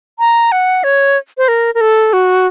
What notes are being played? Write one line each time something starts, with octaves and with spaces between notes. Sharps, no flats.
A#5
F#5
C#5
C5
A#4
A#4
A4
F#4